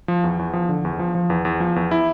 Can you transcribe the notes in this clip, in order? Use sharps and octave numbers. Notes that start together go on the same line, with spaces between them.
F3
E2
E2
F3
D3
E2
F3
F3
E2
E2
F3
E2
E4